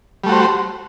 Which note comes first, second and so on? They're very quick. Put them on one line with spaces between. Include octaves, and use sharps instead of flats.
G3 A3 F#4 C5